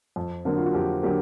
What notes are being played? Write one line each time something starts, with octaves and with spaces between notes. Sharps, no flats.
F2
D3 F#3 A#3
F4
F#4
F2 G4
D3 F#3 A#3 G4